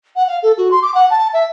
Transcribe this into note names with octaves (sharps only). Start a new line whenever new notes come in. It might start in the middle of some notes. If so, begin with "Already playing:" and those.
F#5
F5
A4
F#4
C6
D6
F#5
A5
E5